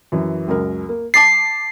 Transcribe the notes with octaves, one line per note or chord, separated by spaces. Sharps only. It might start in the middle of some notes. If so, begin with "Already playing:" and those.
F#2 E3
C#2 F#2 A#4
A#3
A5 D6 A6 C7